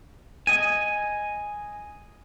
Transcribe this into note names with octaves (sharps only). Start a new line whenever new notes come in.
D#5 G#5